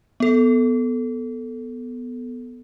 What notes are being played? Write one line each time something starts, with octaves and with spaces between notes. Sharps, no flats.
B3 A4